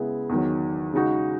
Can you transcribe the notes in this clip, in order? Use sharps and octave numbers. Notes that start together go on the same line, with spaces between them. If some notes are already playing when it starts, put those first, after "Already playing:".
Already playing: C#3 G#3 B3 E4
E2 D#3 F#3
C#3 G#3 D#4 F#4